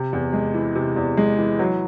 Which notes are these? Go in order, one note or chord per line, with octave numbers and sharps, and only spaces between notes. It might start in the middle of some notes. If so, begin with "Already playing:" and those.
Already playing: C3
E2
G#3
E3
C3
E2
G#3
E3
F#3